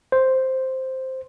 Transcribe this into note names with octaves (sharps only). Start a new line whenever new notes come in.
C5